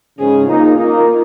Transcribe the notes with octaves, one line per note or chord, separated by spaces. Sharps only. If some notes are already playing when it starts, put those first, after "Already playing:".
G#2 C#3 G#4
A#3 D#4 F4
A#3 D#4